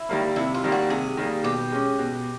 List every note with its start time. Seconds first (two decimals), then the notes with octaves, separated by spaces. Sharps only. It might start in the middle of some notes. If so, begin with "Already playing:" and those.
Already playing: E4
0.09 D#3 G3 A#3
0.36 C3 E4
0.54 F4
0.64 D#3 G3 A#3
0.72 F#4
0.90 C3 G#4
1.17 D#3 G3 A#3
1.44 B2 G4
1.72 G#3 C#4
1.99 B2